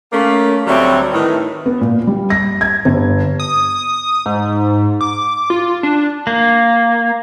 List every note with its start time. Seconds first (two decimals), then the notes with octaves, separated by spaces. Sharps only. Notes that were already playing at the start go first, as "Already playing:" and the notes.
0.13 A3 A#3 C#4
0.67 D2 F#3 G3 A3 C4 C#5
1.12 A2 D#3 E3
1.66 B3
1.81 A#2
2.07 G3
2.30 A#6
2.61 G#6
2.85 G1
3.40 D#6
4.26 G#2
5.01 D6
5.50 F4
5.83 D4
6.27 A#3